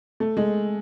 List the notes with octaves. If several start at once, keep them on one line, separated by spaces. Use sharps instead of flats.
A3
G#3